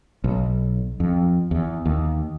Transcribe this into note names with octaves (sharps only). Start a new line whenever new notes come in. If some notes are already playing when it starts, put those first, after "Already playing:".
B1
F2
E2
D#2